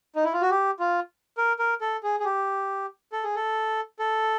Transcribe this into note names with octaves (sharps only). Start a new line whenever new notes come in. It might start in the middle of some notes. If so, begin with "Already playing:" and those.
D#4
E4
F4
F#4
G4
F4
A#4
A#4
A4
G#4
G#4
G4
A4
G#4
A4
A4